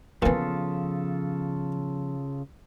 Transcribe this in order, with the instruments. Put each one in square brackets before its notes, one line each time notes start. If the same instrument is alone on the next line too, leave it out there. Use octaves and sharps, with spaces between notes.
[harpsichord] A#2 E3 [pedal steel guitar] C#3 F4 A4 [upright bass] F3 B3